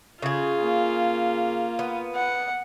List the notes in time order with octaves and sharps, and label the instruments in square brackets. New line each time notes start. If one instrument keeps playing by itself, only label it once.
[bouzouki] C#3 G#4 [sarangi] F4
[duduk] A#3
[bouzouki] B3
[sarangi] F#5